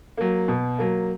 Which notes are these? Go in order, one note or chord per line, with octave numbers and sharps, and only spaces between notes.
F#3 A#3
B2
F#3 A#3